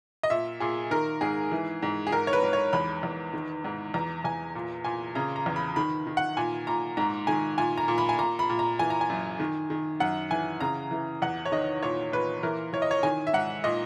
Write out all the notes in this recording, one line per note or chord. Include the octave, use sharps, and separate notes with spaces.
D#5
A#2 E5
A#2 G#4
D#3 A#4
G#2 G#4
E3
G#2
G#4
G#2 A#4
C#5
B4
G#2
C#5
E2 B5
E2
D#3
G#2
E2 A#5
E2 G#5
A#2
A#2 G#5
C#3 A#5
A#5
E2
B5
D#3 B5
D#3
F#5
A#2 G#5
A#2 A#5
G#2 A#5
D#3 G#5
A#2 G#5
A#5
A#2
B5
G#5
A#2 A#5
B5
A#2
A#5
E3 G#5
A#5
G#5
F#2
D#3
D#3
F#2 F#5
E3 G#5
C#3 A#5
E3
E2 F#5
C#5
D#3 D#5
A#2 C#5
A#2 B4
E3 A#4
E3 C#5
D#5
C#5
D#3 G#5
E5
G#2 F#5
A#2 D#5